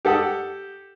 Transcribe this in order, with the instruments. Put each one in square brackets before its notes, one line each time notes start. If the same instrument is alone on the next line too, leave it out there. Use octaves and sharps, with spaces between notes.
[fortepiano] G4 A4 F#5 D#6